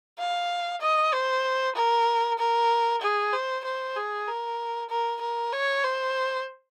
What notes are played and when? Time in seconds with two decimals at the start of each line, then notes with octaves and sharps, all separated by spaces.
0.19 F5
0.82 D#5
1.13 C5
1.76 A#4
2.39 A#4
3.02 G#4
3.33 C5
3.65 C5
3.96 G#4
4.27 A#4
4.90 A#4
5.21 A#4
5.53 C#5
5.84 C5